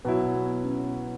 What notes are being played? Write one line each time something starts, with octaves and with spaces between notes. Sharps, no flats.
B2 F#3 E4 B4
B3
C#4